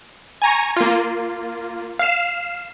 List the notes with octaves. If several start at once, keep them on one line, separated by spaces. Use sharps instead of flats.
G#5 A#5 C#6
A#3 F4
F5 F6 C7 E7